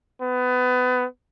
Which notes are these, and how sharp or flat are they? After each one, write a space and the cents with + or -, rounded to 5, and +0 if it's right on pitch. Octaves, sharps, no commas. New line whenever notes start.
B3 +25